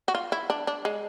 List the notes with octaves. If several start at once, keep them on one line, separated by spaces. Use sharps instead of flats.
F#4
F4
E4
D4
D4
G#3